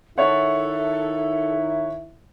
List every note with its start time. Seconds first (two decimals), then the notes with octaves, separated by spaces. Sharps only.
0.18 D#3 D#4 E4 A4 C#5 E5 F#5